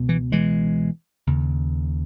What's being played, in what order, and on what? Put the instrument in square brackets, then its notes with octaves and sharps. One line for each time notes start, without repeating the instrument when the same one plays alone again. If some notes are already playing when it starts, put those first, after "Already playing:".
Already playing: [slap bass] C#2 B2
E3
E3 G#3
D#2 C#3